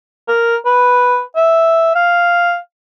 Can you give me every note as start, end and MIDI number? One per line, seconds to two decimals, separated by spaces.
0.28 0.56 70
0.66 1.21 71
1.36 1.93 76
1.95 2.57 77